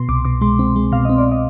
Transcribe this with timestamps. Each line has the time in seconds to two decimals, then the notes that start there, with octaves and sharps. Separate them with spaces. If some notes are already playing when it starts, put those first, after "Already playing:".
Already playing: B2 C6
0.09 C2 D6
0.25 B2 D6
0.41 G#3 C6
0.59 C4
0.76 G#3
0.92 B2 F5
1.05 C4 D#5
1.18 D5
1.32 D#5